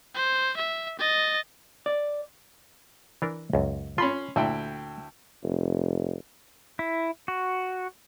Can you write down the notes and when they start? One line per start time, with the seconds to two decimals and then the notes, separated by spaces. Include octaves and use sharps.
0.15 C5
0.57 E5
0.99 D#5 A6
1.86 D5
3.22 E3 D4 A#4
3.53 C#2 F#2
3.98 C#4 F4 B5 C6
4.36 D2 A#2 E4 G5
5.43 F1
6.79 E4
7.28 F#4